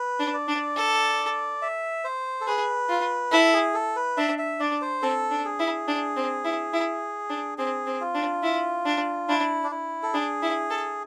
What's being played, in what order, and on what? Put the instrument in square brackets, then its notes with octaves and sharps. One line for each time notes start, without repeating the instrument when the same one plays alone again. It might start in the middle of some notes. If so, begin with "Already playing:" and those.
Already playing: [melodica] B4
[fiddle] D4
[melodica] D5
[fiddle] D4
A4
[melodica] E5
C5
A4
[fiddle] G#4 [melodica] B4
[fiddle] F4
[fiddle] E4 [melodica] A4
[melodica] G#4
A4
B4
[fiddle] D4 [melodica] E5
[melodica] E5
[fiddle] D4 [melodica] D5
[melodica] C5
[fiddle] C4 [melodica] A4
[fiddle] D4
[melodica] G#4
[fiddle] E4
D4
C4
E4
E4
D4
[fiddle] C4 [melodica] G#4
[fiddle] C4
[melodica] F4
[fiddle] D4
E4
D4
[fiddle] D4 [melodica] E4
[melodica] D4
E4
A4
[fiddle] D4 [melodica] G#4
[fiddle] E4
A4